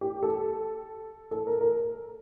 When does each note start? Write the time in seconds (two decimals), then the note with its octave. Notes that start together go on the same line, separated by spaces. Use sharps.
0.01 G4
0.23 A4
1.31 A4
1.47 A#4
1.61 A#4